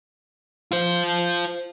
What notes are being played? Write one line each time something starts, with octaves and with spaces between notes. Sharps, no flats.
F4 C5